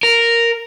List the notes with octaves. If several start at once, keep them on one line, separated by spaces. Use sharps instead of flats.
A#4